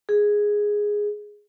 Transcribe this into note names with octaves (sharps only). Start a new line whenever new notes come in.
G#4